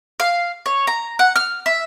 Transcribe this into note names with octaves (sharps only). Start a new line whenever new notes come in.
F5
C#5
A#5
F#5
F6
E5